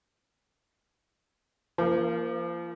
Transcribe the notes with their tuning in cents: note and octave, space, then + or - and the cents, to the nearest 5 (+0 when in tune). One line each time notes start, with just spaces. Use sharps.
F3 -35 A#3 +0